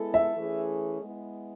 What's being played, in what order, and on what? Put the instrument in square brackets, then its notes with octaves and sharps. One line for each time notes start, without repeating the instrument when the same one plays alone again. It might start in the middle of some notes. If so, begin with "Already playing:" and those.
Already playing: [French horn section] G#3 B3 E4 A4
[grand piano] E5
[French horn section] E3 A3 C#4 G#4
G#3 B3 E4